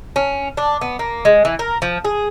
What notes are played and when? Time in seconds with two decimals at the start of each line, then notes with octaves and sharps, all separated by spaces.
0.16 C#4
0.57 D4
0.81 B3
0.99 A#3
1.25 G#3
1.45 E3
1.59 A#4
1.82 F3
2.05 G#4